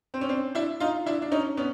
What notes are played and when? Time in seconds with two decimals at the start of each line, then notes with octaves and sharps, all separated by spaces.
0.14 C4
0.21 C#4
0.29 C4 D4
0.55 D4 E4
0.80 D#4 F4
1.06 D4 E4
1.22 D4
1.32 C#4 D#4
1.57 B3 C#4